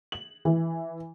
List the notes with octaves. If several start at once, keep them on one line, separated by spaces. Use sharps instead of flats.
F#7
E3